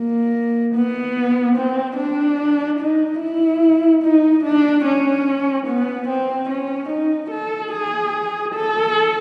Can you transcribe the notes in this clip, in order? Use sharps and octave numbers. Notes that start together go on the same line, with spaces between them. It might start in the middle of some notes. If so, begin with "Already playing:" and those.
Already playing: A#3
B3
C4
D4
D#4
E4
D#4
D4
C#4
B3
C4
C#4
D#4
A4
G#4
A4